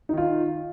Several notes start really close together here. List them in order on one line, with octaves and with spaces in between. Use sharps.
D#4 D#3 F4